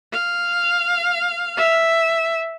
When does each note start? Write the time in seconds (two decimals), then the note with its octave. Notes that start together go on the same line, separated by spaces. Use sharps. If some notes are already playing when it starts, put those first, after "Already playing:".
0.12 F5
1.57 E5